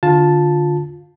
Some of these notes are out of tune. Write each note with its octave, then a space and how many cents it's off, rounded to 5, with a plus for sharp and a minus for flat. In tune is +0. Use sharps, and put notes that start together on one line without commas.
D3 +0 F4 +15 A5 +0